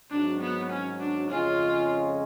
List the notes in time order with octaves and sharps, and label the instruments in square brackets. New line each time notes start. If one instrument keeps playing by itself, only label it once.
[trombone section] G#1 G#2 F#3 [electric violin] D4
[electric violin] B3
C#4
D4
[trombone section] F2 C#3 G#3 C#4 [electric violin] F4